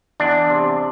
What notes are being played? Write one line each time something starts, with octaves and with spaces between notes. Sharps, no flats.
E2 D4
C3